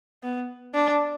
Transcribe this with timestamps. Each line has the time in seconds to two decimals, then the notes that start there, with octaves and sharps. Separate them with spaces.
0.23 B3
0.74 D4